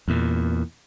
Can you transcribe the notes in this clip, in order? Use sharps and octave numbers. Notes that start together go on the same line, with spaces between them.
E2 A#2